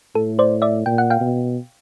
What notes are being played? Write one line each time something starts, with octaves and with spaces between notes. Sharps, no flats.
A2 A4
C5 D5
D5 E5
A#2 G5
F#5
F5 G5
B2